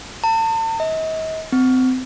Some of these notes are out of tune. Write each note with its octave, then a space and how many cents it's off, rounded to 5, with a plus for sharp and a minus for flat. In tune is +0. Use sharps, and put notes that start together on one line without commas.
A5 +40
D#5 +40
C4 -30